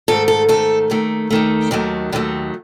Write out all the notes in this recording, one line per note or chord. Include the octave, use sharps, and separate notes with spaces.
G#2 D#3 A3 A4
A4
G#2 D#3 A3 A4
D#2 D#3 A3
D#2 D#3 A3
D#2 D#3 F#3 A3
D#2 D#3 F#3 A3